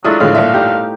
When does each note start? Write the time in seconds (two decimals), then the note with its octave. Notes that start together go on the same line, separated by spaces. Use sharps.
0.04 F#3 G#3 D4 E4 F4 A4 D#6
0.20 A#1 A2 D3 G#3 B4 F5
0.35 G1 A#2 E5
0.54 D#4 G4